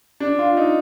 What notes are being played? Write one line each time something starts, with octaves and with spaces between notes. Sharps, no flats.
D4
F4
D#4